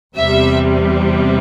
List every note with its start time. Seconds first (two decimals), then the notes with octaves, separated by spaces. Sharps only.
0.17 E2 C3 G3 E5